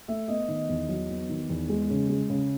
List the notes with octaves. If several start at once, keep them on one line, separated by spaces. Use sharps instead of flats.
A3 E5
B3 D#5
D#3
E2
F#3
B3
D#3
E2
G#3
C#3
G#3
C#3